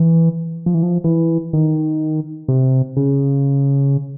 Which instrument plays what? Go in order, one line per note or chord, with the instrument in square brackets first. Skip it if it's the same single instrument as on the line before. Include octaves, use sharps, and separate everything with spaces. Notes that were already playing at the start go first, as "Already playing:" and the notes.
Already playing: [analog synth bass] E3
F3
E3
F3
E3
D#3
C3
C#3